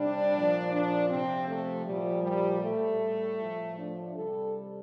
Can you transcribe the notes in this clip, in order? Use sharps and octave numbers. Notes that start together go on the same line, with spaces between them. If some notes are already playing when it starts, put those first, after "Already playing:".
Already playing: C3 G3 D4
A#2 F3
D4
C3 F3 C4
A3
A#2 F3 G3
G3
A2 G3 A3
A2 F3
D4
C3 G3 A4